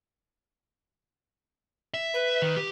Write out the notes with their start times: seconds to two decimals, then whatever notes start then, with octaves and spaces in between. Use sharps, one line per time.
1.94 E5
2.13 B4
2.42 D#3
2.57 G4